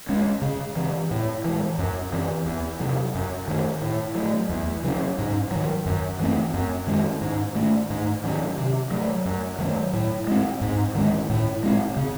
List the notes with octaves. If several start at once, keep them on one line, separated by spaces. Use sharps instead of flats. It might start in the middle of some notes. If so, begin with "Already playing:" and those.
G#3 C#4
C#3
E3 C4
A2
E3 G#3
F#2
E3 C4
E2
C3 F#3
F#2
D#3 A3
A2
F#3 A3
E2
C#3 F#3 C#4
G#2
D#3 F#3
F#2
E3 A3 C4
F#2
D#3 G#3 C#4
G#2
D#3 A3
G#2
D#3 F#3 C#4
C3
F#3 A3
F#2
D#3 F#3 A3
A2
G#3 C4
G#2
D#3 G#3 C#4
A2
G#3 C4
C#3